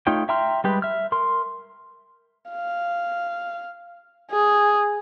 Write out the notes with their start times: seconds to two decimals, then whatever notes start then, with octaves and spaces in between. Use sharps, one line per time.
0.07 A3 D#4 F4 C#5 G5
0.29 E5 G5 A#5 C6 F6
0.64 G3 G#3 G4 B4
0.82 E5 F6
1.12 A#4 C6
2.50 F5
4.31 G#4